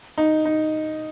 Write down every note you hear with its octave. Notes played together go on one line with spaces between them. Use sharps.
D#4
D#4